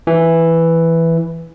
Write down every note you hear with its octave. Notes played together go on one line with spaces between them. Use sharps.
E3